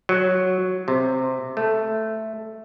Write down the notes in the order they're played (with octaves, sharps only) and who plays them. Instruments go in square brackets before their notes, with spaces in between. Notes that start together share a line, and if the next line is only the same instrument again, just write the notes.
[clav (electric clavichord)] F#3
C3
A3